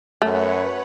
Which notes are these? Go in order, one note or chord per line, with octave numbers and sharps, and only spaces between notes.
F#2 A3 B4 C#5 F#5